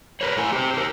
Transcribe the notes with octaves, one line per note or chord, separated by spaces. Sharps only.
A#4 B4 C#5
A3 E4 G#5
G4 C5
G4 A#4